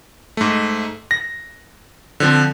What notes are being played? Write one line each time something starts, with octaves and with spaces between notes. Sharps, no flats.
G#2 A3
A#6
D3 F3 C4